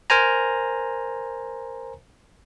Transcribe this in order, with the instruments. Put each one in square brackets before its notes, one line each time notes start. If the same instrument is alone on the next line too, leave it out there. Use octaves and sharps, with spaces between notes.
[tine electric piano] A#4 C5 G#5 A#5